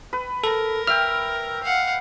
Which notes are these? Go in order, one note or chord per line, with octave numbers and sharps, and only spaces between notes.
B4
A4 A#4
E5 G5 F6
F5 F#5